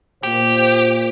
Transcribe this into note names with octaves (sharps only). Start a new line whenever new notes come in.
A#2 G4 C5